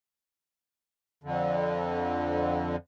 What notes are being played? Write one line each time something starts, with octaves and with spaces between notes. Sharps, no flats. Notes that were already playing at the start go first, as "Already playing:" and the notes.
F2 D3